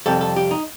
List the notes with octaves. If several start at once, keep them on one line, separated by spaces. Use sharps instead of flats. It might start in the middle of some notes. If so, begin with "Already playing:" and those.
F2 C3 G3 A4
A4
G4
D#4